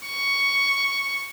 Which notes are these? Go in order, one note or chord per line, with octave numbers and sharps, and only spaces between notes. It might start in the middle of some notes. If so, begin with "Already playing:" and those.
C#6